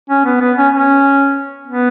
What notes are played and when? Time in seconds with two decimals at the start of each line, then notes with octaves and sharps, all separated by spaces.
0.10 C#4
0.25 B3
0.41 B3
0.57 C#4
0.73 C#4
1.67 B3